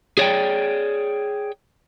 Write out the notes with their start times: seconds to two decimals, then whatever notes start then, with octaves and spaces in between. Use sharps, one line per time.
0.18 G#4 C#5 D5 G5